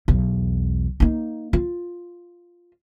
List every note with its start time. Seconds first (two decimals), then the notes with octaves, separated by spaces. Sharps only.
0.08 B1 E2
1.00 A#3 D#4
1.53 F4